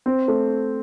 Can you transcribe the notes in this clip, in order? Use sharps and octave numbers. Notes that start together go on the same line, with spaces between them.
C4
A3